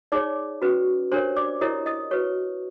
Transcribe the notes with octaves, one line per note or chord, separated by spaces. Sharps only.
D#4 G#4 C#5 D5 D6
C#4 F#4 B4
D4 G4 A#4 C5 C#5 C6
D5 D6
E4 G4 A#4 C#5 D#5 D#6
D#5 D#6
F#4 B4 C#5 C#6